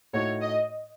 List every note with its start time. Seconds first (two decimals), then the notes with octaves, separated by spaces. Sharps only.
0.13 A2 A3 D#4 F#4 C#5
0.42 D#5